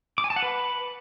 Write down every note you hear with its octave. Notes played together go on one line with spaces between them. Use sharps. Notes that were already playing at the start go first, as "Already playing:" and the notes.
D6
G#5
A5
F#5
B4